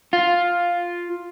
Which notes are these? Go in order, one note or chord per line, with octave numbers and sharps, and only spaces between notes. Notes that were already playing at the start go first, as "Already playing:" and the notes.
F4